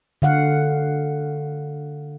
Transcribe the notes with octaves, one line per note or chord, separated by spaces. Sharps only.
D3 F5 F#5